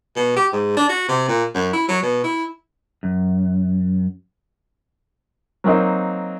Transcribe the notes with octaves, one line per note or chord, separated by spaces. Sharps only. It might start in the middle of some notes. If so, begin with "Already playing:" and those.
B2
G4
G#2
D4
F#4
C3
A#2
F#2
E4
F#3
B2
E4
F#2
F#3 A#3 C4 D#4